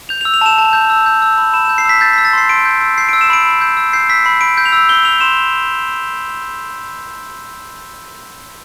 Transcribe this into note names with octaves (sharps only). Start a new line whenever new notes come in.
G6 F7
F7
E6
F7
A5 E7
A5
G6
E6
G6
E6
B5
B5 E7
E7
G6
C7
E6 B6
G6 A6
B6
E6
A6
C6 C7
C6 D7
G6
E6
G6 C7
D7
E6
E7
B5 D7
B5
G6
E6
G6 C7
E6 B6
B5 C7
B5 D7
G6
F7
E6
G6 G7
E6 F7
C6 E7